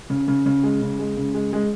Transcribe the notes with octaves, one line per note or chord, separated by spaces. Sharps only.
C#3
C#3
C#3
G#3
C#3
G#3
C#3
G#3
G#3